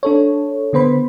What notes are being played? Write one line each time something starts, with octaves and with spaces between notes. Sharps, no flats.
D4 A4 C#5
D3 B3 C5 B5